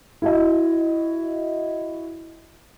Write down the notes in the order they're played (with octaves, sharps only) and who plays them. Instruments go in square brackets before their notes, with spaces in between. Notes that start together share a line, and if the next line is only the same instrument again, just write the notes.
[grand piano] E4 F#4 D#5